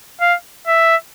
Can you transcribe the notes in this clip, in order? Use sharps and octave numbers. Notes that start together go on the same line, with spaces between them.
F5
E5